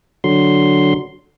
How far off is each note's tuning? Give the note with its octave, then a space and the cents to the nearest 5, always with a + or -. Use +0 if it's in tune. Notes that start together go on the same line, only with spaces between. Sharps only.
D3 +0 F#3 +0 C6 +0